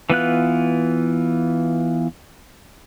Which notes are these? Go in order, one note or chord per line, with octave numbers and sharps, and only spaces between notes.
E3 B3 F4 F#6